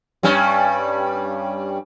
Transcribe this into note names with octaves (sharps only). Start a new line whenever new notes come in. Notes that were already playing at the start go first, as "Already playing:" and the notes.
G2 G3 C#4